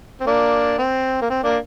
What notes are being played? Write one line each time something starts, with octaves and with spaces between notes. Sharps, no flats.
C4
A#3 D4
C4
A#3
C4
A#3 D4